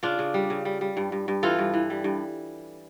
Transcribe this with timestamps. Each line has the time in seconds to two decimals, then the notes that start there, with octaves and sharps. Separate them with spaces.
0.03 C#3 D4 F4
0.19 C#3
0.34 G3
0.50 C#3
0.65 G3
0.81 G3
0.97 G2
1.12 G2
1.28 G2
1.43 E3 F4 A4
1.59 G2
1.74 E3
1.90 G3
2.04 G2